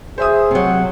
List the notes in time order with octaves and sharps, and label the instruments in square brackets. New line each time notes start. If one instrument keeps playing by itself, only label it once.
[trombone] G#4 [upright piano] C5 E5 D#6
[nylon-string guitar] C3 F#3